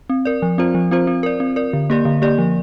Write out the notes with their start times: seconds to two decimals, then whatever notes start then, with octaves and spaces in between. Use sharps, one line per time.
0.10 C4
0.25 A#4 D5
0.42 F3
0.58 C4 F4 C5
0.75 F3
0.91 C4 F4 C5
1.07 C4
1.23 A#4 D5
1.40 C4
1.56 A#4 D5
1.73 D3
1.90 A#3 G4 D5
2.05 D3
2.22 A#3 G4 D5
2.38 F3